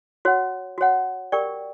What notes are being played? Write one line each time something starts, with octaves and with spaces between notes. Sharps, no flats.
F#4 C#5 F#5
F#4 C#5 F#5
G4 A#4 D5 G5 C#6